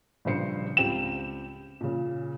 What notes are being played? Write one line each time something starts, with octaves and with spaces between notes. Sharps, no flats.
A#1 G2 C#3 C5 C7 C#7
C#2 C4 G4 G5 E7
A#2 C#3